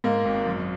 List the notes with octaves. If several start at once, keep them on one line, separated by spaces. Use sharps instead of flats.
G#2 A#3
G#1
F#2